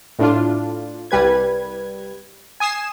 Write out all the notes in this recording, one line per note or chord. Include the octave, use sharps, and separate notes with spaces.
A2 D4 F4
C2 G3 B4 G#6
G#5 D#6 C7 E7